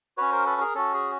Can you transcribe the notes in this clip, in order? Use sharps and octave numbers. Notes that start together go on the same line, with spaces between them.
C#4 F#4 B4 C#5
A#4 C5
A4 B4
G#4 A#4
C#4 F#4 A4
G#4